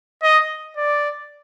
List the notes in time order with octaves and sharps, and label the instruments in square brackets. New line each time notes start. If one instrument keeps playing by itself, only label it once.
[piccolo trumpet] D#5
D5